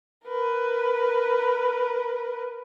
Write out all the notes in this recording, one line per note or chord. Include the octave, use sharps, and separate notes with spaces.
A#4 B4